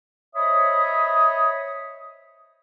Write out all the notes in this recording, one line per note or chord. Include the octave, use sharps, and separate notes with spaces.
C5 C#5 D#5 E5 B5 D#6